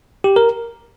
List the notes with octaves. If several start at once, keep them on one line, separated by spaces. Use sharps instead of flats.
G4
A#4